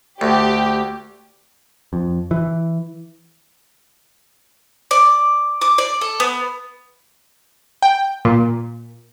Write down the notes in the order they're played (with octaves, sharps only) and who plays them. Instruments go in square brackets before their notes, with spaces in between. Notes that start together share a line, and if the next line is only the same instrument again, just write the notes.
[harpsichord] D2 [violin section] G4
[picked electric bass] F2
E3
[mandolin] D5
D6
D5
A4
B3
[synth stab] G5
A#2